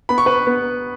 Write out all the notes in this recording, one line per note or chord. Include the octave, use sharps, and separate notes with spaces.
B3 B5
C#6
B4 B5
B3